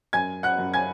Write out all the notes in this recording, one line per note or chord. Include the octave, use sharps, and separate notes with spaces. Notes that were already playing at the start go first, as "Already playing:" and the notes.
F#2 G#5 G#6
F#5 F#6
F#2
G#5 G#6